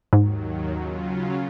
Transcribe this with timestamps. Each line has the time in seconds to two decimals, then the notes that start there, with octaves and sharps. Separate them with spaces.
0.13 D#2 G#2 D#3 F#3
0.74 C#3 F#3 C#4 F4